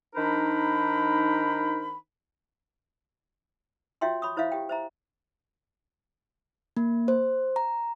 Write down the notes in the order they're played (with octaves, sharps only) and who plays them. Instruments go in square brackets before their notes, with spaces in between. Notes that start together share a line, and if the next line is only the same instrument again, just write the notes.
[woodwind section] D#3 D4 D#4 A#4 C5 B5
[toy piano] F4 F#4 C#5 E5 G5 C6
C#5 B5 C#6 D#6
E4 C5 C#5 E5 F5
G4 G5
C5 E5 A#5
[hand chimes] A#3
C5
A#5